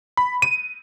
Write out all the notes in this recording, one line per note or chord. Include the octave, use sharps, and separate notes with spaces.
B5
D#7